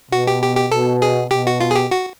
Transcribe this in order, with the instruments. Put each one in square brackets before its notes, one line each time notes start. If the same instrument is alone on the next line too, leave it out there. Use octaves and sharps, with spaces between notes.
[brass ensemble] B2 [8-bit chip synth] F#4
[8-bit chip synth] G4
G4
G4
[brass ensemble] B2 [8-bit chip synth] A4
[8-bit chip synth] G#4
[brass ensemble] B2 [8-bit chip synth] G4
[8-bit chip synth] F#4
F4
G#4
G4
F#4